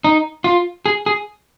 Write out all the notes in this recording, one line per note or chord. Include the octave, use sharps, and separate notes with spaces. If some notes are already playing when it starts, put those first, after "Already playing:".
D#4
F4
G#4
G#4